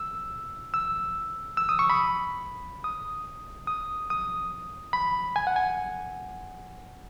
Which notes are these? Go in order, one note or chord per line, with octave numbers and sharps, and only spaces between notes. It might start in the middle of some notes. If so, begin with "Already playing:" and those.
Already playing: E6
E6
E6
D#6
C#6
B5
D#6
D#6
D#6
B5
G#5
F#5
G#5